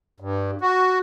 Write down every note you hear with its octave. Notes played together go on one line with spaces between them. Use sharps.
G2
F#4